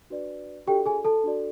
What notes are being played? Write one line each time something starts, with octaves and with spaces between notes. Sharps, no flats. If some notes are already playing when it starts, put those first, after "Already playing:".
D4 F#4 B4 D5
D4 F#4 G4 A4 D5 G5
G#4 G#5
A4 A5
D4 F#4 A4 D5